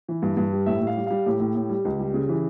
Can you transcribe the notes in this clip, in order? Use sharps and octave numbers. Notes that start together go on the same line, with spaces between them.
E3
G2
G2
G3
A2 E5
A2
F5
G3
G3 F5
A2 G4
A2
A2
G3
C#2
G3
C#3
E3